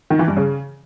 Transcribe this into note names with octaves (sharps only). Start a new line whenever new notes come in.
D#3
E3
G2
C#3